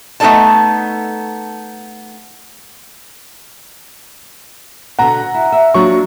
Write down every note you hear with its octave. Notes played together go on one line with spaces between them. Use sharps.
A3 B3 D#4 A4 D5 A5
B2 D3 F#5 A#5
E4
E5
F#3 A#3 D4 F4 C#6